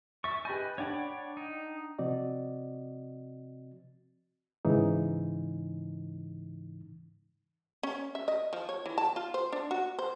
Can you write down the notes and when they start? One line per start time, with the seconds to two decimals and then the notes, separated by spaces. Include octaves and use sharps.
0.24 E5 C#6 A6
0.45 G4 B4 D#5 G#5 B5 G6
0.78 D4 C#5 D5 F#5 G5 B5
1.37 D#4
1.99 C3 F3 C4 F#4 D5 D#5
4.65 G#2 C#3 E3 D#4
7.83 C#4
8.15 E5
8.28 D#5
8.53 F3
8.69 C#5
8.86 E3
8.98 A5
9.16 F4
9.34 C5
9.53 D4
9.71 F#4
9.99 C5